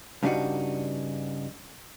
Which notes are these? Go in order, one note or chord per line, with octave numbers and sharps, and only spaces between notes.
G2 C#3 G3 D4 D#4 F#4